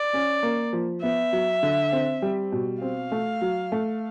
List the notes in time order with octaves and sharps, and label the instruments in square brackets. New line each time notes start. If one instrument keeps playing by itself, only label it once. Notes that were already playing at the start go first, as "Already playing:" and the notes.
Already playing: [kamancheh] D5
[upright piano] C#4
A#3
F3
[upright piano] B3 [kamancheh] E5
[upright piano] F#3
D3
C4
G3
B2
[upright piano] C4 [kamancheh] F5
[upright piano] A3
F#3
A3